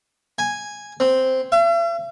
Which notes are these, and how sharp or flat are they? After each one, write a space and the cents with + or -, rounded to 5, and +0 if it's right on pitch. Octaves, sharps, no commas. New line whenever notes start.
G#5 -5
C4 -5
E5 +45